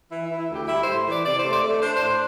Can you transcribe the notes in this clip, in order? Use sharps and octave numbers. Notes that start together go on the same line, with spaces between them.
E3 E4
E4
E3
E4
D2 G4
G3 E4
A2 C5
E3
D5
C3 D5
C5
A3
D5
A3
D4 C5
C5
A2
C5